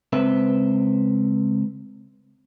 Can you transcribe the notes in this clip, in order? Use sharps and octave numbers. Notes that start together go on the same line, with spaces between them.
C#2 C4 B4 E5